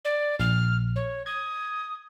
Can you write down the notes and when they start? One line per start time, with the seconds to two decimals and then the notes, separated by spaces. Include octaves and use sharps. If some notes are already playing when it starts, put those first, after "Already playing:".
0.05 D5
0.40 A#1 F6
0.96 C#5
1.26 D#6 G#6